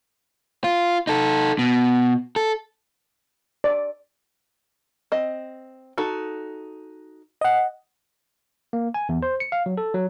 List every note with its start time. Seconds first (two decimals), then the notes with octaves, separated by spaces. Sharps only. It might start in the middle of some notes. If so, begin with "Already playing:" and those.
0.64 F4
1.07 D#4 A4
1.59 B2
2.36 A4
3.64 D5
5.12 C4 D#5
5.98 D#4 F#4 A4
7.41 D#5 F#5
8.73 A#3
8.94 G#5
9.09 E2
9.23 C5
9.40 C#7
9.52 F5
9.66 F#3
9.78 A4
9.94 F#3